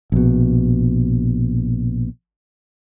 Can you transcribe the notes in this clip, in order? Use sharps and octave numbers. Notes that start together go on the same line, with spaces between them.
A#1 B2